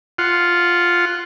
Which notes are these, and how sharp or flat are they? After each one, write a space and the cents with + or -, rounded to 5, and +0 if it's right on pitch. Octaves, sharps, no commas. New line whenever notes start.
F4 +0 F#5 +0